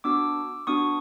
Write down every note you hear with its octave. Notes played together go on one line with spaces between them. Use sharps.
B3 D4 F#4 D6 E6
B3 D4 F#4 C#6 D#6